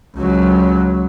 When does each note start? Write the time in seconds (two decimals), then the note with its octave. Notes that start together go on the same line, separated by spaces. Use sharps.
0.15 C#2 F#3